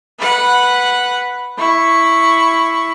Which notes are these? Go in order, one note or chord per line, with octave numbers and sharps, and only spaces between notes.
B4 F#5
E4 C#6